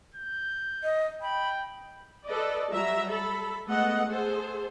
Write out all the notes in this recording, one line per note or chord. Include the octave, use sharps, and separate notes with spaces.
G6
D#5
G5 B5
A4 B4 D5 D#5
F#3 G3 E5 A#5
A4 B5
G#3 A3 B3 A4 D#5 F#5
G#4 A4 C5